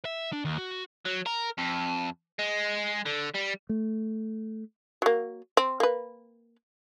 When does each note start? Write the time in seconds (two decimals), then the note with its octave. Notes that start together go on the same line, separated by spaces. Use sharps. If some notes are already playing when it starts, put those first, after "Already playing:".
0.05 E5
0.33 D4
0.45 D#2
0.58 F#4
1.05 F#3
1.26 A#4
1.58 F2
2.39 G#3
3.06 D3
3.35 G3
3.69 A3
5.02 F#3 A#3
5.57 C4
5.80 A#3 B4